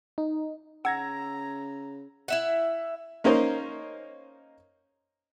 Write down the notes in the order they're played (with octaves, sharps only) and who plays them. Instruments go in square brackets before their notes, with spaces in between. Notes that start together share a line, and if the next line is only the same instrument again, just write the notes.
[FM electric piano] D#4
[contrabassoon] C#3 [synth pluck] F#5 [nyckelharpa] A#5 [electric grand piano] E6 G#6 A#6
[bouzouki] E4 E5 F#5
[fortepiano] A#3 C#4 D#4 A#4 C5 D#5